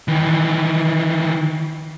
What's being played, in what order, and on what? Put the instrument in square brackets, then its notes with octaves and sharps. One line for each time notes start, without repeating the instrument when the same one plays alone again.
[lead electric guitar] D#3 E3